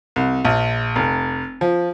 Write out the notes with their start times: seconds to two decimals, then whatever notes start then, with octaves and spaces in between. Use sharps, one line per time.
0.16 C2
0.45 A#1
0.96 F1
1.61 F3